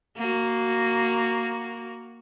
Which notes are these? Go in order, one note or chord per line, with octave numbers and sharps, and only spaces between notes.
A#3 F#4